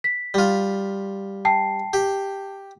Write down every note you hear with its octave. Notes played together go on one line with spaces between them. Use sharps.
B6
G3 F4
G5 A5 C7
G4